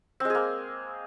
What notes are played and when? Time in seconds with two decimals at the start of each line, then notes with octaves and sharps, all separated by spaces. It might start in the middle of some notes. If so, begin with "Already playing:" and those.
0.20 C4
0.25 G#3
0.30 G#4
0.35 A#3